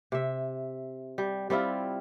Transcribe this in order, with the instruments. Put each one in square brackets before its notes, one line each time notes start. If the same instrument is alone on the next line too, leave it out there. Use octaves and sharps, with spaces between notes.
[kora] C3 E5
G3
G3 C4 E4 F4